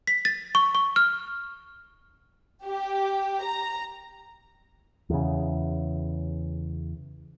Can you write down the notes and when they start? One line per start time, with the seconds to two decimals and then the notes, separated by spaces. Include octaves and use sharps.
0.07 B6
0.25 A6
0.55 C#6
0.75 C#6
0.96 F6
2.66 G4
3.44 A#5
5.10 E2 C#3